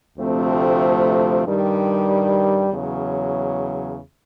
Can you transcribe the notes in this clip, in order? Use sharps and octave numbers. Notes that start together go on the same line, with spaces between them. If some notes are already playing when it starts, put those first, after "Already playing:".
D2 C3 F3 A3 C4
G2 D#3 G3
E2 C#3 F#3